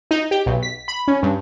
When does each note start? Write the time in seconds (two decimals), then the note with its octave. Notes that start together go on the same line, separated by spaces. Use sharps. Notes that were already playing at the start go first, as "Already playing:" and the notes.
0.11 D#4
0.31 G4
0.46 B1
0.63 B6
0.88 B5
1.08 C#4
1.23 G2